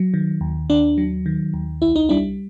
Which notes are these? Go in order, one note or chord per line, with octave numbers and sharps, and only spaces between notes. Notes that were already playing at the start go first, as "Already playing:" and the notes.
Already playing: F#3
D#3
D#2
D#2 D4
F#3
D#3
D#2
C2 E4
D#4
G3 D4 E4